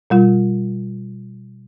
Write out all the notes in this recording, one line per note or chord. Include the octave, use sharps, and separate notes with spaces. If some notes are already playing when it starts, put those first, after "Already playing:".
B2 G3 F4